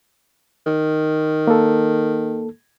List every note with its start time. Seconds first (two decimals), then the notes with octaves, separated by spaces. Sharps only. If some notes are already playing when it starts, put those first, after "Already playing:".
0.66 D#3
1.47 A#3 A4